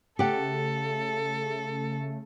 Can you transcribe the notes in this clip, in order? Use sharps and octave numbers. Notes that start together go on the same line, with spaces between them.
C#3 A3 G4 A4 F#5